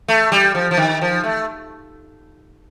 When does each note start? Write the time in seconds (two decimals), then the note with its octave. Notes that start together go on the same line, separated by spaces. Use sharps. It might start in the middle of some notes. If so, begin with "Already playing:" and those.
0.08 A3
0.32 G3
0.55 F3
0.71 F3
0.77 D#3
1.01 F3
1.24 A3